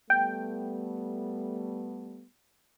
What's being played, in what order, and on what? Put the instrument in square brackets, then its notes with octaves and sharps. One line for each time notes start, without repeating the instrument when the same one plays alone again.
[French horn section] G3 A3 B3 [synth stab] G5